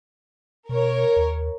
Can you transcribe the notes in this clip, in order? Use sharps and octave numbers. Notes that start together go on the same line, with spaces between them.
B2 A#4 C#5
D#2